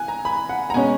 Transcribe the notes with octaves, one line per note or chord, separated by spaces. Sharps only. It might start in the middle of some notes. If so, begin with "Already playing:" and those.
Already playing: G#5 F#6
A#5
B5
F#5
A#5
B2 G#3 C#4 G#5